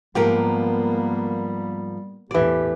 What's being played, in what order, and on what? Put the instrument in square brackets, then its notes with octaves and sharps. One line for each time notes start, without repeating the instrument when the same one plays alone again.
[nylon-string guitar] G#2 F3 A#4 [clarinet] G3 [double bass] A#3 B3 [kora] G4
[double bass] E2 A2 [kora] E3 D5 [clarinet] G4